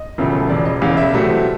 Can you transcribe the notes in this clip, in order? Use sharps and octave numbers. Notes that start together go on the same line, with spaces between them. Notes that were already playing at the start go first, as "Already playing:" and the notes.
Already playing: D#5
E1 D2 C#3 F3 A3
E1 E2 C#3 D5
D#5
E1 E2 C#3 F5
E5
C2 B2 F#3 A3 C4